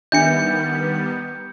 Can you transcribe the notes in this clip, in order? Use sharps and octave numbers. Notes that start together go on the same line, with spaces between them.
D#3 G3 B3 D4 E5 G6 C#7